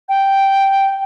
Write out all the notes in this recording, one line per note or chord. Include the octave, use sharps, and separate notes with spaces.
G5